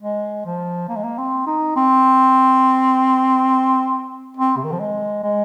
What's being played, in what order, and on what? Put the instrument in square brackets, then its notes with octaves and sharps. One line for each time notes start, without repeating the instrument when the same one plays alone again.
[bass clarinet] G#3
F3
A#3
G#3
A#3
C4
D#4
C4
C4
C3
D#3
F3
G#3
G#3